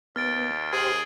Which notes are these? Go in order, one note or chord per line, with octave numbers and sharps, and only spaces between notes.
D#2 B3 F6 A6 D7
G4 G#4 C5 F6 C7 F#7